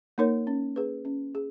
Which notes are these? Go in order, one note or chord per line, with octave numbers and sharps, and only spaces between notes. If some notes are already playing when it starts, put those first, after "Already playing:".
A#3 D#4 A#4 C#5
C#4
G#4 B4
C#4
G#4